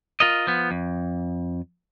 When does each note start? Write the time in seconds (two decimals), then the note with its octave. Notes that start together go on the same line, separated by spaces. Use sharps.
0.20 F4 A#4 D#5
0.47 F3 B3
0.71 F2